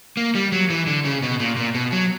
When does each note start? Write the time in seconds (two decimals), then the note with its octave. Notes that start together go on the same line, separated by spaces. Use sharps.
0.17 A#3
0.35 G3
0.52 F#3
0.70 E3
0.87 D3
1.05 C#3
1.22 B2
1.40 A#2
1.57 A#2
1.74 B2
1.92 F#3